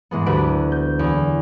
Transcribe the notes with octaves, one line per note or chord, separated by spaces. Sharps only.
G#2 E3 G#3 B3
D2 F#4 G4 B4 D7
G6
E2 B3